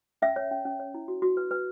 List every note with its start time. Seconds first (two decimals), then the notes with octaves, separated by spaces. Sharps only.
0.22 C#4 E5
0.36 C#5
0.51 C#4
0.65 C#4
0.80 C#5
0.94 E4
1.08 F#4
1.22 F#4
1.37 B4
1.51 B4